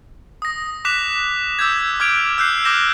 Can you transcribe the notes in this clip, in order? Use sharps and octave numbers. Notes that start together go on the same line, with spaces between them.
D#6 A#6
D6 F#6 B6 E7 F7
D6 E6 G6 G#6
D6 F6 G#6 D7 F7
E6 F#6 G6 C7
D6 F6 G6 A#6 E7